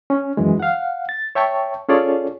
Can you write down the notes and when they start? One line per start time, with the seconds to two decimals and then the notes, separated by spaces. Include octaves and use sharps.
0.10 C#4
0.37 F#2 E3 G#3
0.60 F5 F#5
1.09 A6
1.35 C#5 E5 G5 A5 C#6
1.89 C#4 F4 G#4 A4 C#5 D5